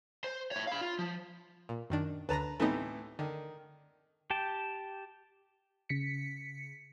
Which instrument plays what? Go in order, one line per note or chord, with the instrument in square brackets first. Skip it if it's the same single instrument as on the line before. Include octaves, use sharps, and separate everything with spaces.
[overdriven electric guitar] C5
E4 C#5
F5 B5
F4
F3
[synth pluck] A#2
F#2 D#3 D4
[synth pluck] D2 D3 A#6 [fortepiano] B4 A5 A#5
[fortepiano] A2 C3 E3 [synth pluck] A3 B3 D#4
[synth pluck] D3 [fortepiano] D#3
[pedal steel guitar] G4 G5 A5
[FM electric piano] C#3 B6 C#7